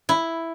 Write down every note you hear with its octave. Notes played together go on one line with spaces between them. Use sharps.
E4